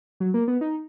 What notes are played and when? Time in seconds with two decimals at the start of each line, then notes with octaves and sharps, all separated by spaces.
0.20 F#3
0.34 A#3
0.48 B3
0.61 D#4